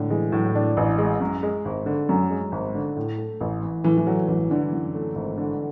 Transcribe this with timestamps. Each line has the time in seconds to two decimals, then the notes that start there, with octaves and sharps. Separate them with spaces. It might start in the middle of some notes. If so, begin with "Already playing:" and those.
Already playing: A2 D3
0.10 E3 G#3
0.32 A2 F#3
0.55 D4
0.77 A1
0.98 G#3
1.20 F#2
1.43 G#3
1.65 G#1
1.86 D3
2.09 F#2 F#3
2.30 G#3
2.52 G#1
2.75 D3
2.97 A2
3.18 A3
3.41 A1
3.63 E3
3.84 A2 E3
3.97 E3
4.07 F#3 A3
4.28 A1 E3
4.50 D3 E3
4.73 F#2
4.95 A3
5.16 G#1
5.38 D3